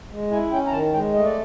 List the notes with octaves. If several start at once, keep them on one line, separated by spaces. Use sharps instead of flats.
G#3
E4 G#5
C#4 G5
A#5
D#3 A5
G#3 G5
A3 D#5
D5